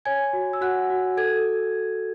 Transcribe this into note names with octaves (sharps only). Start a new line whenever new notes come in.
C#5 G#5 G#6
F#4
E6
F#4 F#5 F#6
F#4
A4 G#6